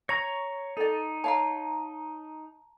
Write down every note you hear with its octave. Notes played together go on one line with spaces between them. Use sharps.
C#5 A#5 C#6 A#6
D#4 A4 D5
C#5 F5 A5 A#5